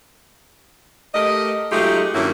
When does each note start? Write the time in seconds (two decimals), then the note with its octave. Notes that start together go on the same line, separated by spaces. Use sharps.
1.15 A3 G4 A#4 D#5
1.72 F#3 G#3 A3 D#4 F4 G4
2.15 G2 D#3 F#3 A#3 C#4 E4